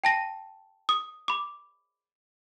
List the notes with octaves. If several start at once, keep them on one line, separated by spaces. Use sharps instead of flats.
G5 A5 A#6 D#7
D#6
B5 D6